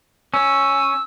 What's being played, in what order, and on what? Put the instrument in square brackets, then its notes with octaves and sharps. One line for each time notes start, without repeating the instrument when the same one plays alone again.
[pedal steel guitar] C#4 [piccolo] E6